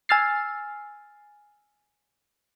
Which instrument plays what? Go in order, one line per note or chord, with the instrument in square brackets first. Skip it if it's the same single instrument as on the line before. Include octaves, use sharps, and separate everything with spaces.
[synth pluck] G#5 E6 F6 A6 C7